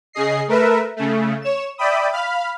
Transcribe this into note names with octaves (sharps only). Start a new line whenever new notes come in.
C#3 G#4 D#5 C7
A3 A#4 B4 E5
C#3 A3
C#5 E7
D5 E5 G5 B5 D#6
F5 B5 F6